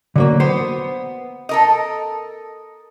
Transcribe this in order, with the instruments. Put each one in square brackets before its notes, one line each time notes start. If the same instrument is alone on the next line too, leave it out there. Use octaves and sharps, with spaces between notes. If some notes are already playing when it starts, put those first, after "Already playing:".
[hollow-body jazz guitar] D3 F#3 A#3
[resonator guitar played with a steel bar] B3 [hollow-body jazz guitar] C5
[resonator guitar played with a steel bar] A4 A#4 D#5